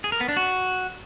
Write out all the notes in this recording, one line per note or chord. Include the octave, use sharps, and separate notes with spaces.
G#4
A#4
B3
D4
F#4